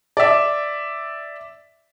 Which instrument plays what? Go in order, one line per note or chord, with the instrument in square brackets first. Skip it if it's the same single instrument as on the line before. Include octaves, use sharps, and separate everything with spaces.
[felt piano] D5 E5